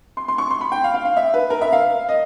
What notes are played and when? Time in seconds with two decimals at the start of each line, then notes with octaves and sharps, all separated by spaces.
0.17 C6
0.28 C6
0.38 C#6
0.50 C6
0.61 B5
0.72 G5
0.84 F5
0.94 F5
1.05 F5
1.17 E5
1.34 B4
1.50 A#4
1.61 E5
1.72 F5
2.09 D#5